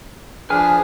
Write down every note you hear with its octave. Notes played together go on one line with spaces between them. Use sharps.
F3 D4 G#4 B4 G#5 F6